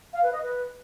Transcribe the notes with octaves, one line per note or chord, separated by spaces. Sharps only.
F5
B4
D#5
B4